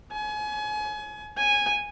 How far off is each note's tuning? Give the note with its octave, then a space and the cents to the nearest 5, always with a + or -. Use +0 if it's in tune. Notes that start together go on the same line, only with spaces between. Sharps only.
G#5 +30
G#5 -10